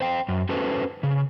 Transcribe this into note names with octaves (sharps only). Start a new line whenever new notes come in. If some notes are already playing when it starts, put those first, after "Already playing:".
C5 F5 G5
F#2
C#4 F#4 A4 B4 C5
C#3